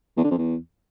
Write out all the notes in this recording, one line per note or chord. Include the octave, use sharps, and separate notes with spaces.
E2
D3
F2
E2